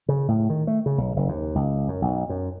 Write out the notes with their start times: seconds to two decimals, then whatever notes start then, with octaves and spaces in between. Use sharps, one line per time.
0.09 C#3
0.28 A2
0.50 D#3
0.67 A3
0.86 C#3
0.98 B1
1.16 F#1
1.28 D#2
1.55 C#2
1.88 F#2
2.02 B1
2.29 F#2